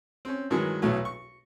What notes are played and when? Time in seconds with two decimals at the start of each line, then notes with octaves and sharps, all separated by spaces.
0.25 C4 C#4
0.50 G2 D#3 E3 F#3 G#3
0.82 B1 E2 F#3 A3 C#5
1.05 C#6